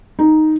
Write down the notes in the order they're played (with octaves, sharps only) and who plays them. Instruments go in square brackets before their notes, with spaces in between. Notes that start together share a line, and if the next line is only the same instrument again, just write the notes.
[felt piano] D#4